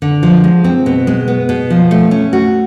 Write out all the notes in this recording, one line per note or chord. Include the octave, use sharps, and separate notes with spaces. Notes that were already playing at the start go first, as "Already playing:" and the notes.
D3
F3
G#3
C4
B2
G#3
B3
B2
F3
A3
C#4
F#4